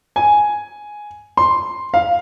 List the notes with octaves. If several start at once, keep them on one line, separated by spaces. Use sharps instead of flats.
G#5
C6
F5